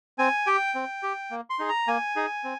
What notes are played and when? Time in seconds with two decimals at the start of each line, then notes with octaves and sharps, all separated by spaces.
0.19 C4 G#5
0.47 G4 G5
0.75 C4
1.03 G4
1.31 A#3
1.50 C6
1.59 D#4 G#4
1.69 A#5
1.88 A#3 G#5
2.16 D#4 G#4
2.44 C4